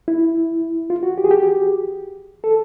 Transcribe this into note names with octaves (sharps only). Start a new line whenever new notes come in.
E4
F4
F#4
G4
G#4
G4
A4